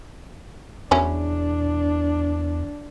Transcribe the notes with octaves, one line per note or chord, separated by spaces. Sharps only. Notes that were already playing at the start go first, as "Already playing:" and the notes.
E2 F#3 C#4 D4 E4